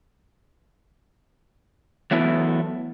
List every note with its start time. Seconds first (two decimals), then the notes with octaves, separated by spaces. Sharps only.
2.11 E3 F#3 A3 B3 E4